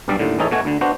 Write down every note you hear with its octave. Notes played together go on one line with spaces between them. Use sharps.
B1 G2 G3 D5
D#2 A2 D3
A1 E3 C#4 D#4 G#4 A4
B2 A3 F#4 G#5
D2 D3
B3 D4 F#4 C5